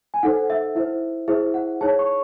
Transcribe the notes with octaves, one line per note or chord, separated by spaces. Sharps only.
G#5
D#4 A4 C5 F#5
E5
E4 C5 E5
E4 G#4 C5 E5
F#5
D#4 G#4 C#5 A5
C#6